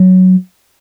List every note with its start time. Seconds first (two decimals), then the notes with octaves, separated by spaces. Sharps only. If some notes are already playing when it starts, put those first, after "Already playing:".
Already playing: F#3